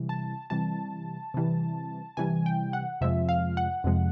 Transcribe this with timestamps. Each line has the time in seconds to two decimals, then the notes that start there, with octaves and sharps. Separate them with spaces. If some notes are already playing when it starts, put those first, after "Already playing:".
Already playing: C3 E3 G3
0.09 A5
0.50 C3 E3 G3 A5
1.34 C3 E3 G3
2.17 C3 E3 G3 G#5
2.46 G5
2.73 F#5
3.01 F2 C3 F3 G#3 E5
3.29 F5
3.57 F#5
3.84 F2 C3 F3 G#3